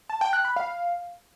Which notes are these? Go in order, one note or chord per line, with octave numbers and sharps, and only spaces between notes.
A5
G5
F#6
B5
F5